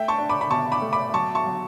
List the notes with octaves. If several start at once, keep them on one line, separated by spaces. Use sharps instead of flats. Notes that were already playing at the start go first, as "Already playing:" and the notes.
Already playing: A3 E5 G5
A5 C#6
D4
B5 D6
B5
B2 A5 C#6
B5 D6
A3
B5 D6
F#3 A5 C#6
A5 C#6
F#3